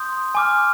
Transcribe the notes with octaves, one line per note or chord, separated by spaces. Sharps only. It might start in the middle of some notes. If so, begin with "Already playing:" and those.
Already playing: C6 D#6 G6
G#5 D6 F6